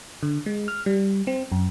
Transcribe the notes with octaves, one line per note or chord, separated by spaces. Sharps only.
D3
G#3
F6
G3
C4
F#2